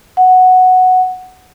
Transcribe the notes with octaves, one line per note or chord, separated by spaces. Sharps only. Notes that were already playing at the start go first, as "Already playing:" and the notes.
F#5